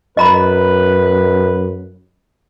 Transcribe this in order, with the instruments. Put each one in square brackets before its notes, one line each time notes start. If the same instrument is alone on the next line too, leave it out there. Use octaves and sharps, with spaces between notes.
[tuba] F#2 [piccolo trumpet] B4 [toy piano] D#5 A#5 B5